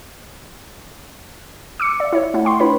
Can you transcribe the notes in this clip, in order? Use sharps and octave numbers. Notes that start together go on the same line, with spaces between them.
D6 E6 C#7
D5
E4 C#5
A3 E4 F#5
G5 C6 C#6
D4 E4 B4 C#5 B5